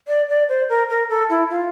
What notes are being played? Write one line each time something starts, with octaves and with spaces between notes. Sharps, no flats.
D5
D5
C5
A#4
A#4
A4
E4
F4